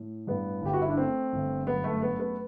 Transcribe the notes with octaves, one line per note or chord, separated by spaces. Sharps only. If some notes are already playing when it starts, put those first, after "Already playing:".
Already playing: A2
G2 B3
G1 G4
F#4
E4
D4
A3 C4
G1
F#2 B3
A3
A3 B3
B3